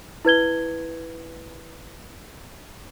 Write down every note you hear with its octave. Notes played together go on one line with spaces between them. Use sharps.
E4 B4 G#6 G7